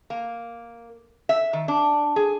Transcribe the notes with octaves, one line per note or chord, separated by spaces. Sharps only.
A#3
E5
D#3
D4
G#4